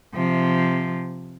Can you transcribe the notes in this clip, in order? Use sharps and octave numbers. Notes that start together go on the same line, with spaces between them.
C3 F3